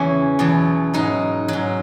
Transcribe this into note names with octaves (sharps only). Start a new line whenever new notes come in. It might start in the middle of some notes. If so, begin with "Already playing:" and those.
Already playing: E2 C#3 E3 C#4
E2 B2 F#3
G#2 F#3 D#4
G#2 F#3